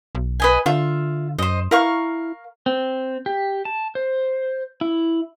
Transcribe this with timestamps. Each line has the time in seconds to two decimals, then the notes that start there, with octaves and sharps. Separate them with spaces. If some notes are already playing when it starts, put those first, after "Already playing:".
0.15 B1
0.40 B4 D#5 G#5
0.66 D3 F4 E5
1.39 F#2 C5 D#5
1.71 E4 A#4 F5 C#6
2.66 C4
3.26 G4
3.65 A5
3.95 C5
4.81 E4